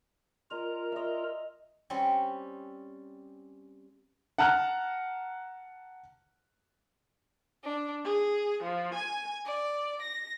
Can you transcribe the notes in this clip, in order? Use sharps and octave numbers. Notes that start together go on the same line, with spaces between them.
F4 A#4 D#5 A#5
D#5 E5
G3 C4 C#4
F#5 A5 A#5 F6 F#6
D4
G#4
F3
G#5
D5
A#6